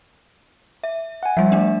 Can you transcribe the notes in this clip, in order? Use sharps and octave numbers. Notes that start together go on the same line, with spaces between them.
E5
F#5 G#5
F3 G3 E5
A3 D4